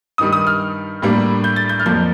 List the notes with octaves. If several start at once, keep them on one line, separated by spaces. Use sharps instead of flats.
G2 D#3 G3 D#6
D#6
F6
A2 G3 A#3 D4
G6
A6
G6
F6
F2 D3 F3 A#3 D4 G6